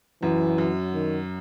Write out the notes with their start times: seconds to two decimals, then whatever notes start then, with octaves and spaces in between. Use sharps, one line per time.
0.23 F#2 E3
0.58 F#2
0.94 D#3